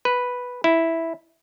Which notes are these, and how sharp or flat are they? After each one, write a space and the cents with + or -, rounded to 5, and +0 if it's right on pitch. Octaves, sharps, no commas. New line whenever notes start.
B4 -5
E4 -5